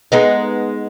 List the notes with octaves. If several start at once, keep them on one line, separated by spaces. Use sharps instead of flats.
G#3 B3 D#4